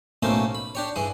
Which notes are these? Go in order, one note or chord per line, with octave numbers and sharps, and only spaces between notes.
B1 A2 A3 A#3 C#4 C5
B5
D4 G4 C#5
G2 E3 G#4